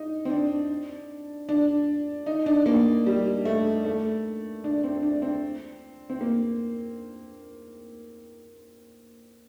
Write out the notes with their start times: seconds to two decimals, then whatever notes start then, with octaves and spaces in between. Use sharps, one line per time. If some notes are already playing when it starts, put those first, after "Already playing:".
Already playing: D#4
0.25 C4
0.30 D4
1.49 D4
2.26 D#4
2.46 D4
2.66 A#3
3.06 G3
3.45 A3
3.85 A3
4.64 D4
4.84 C4
5.03 D4
5.22 C4
6.10 C4
6.21 A#3